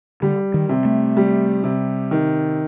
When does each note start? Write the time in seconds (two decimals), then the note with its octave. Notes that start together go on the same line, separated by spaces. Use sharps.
0.22 D3 G3
0.54 D#3
0.69 C3
0.85 A3
1.17 G3
1.64 C3
2.11 D#3